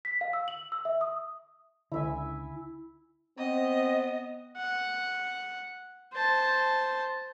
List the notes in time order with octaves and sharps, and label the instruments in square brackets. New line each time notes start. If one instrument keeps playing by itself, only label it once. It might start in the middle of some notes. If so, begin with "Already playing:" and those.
[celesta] B6
F5
E6
F#7
E6
E5
D#6
[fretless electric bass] C#2 D3 [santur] E4 E5 G#5
[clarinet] B3 [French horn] C4 [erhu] D#5
[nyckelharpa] F#5
C5 A5